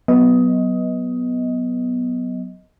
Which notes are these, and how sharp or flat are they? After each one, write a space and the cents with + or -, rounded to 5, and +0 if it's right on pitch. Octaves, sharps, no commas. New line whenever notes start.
F#3 +0 B3 +0 D#5 +15